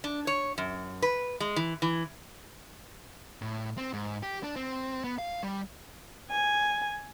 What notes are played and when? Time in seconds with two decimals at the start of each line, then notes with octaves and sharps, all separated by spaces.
0.04 D4
0.27 C#5
0.58 F#2
1.02 B4
1.40 G#3
1.56 E3
1.82 E3
3.42 A2
3.77 C4
3.93 G#2
4.23 G4
4.43 D4
4.56 C4
5.04 B3
5.18 F5
5.43 G3
6.31 G#5